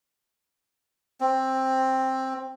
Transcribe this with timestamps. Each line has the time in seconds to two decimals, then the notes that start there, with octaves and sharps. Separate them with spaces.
1.20 C4